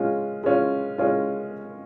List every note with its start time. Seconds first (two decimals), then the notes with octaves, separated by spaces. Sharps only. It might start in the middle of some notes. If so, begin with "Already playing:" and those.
Already playing: G#3 C#4 F4
0.44 G#3 C#4 F4
0.98 G#3 C#4 F4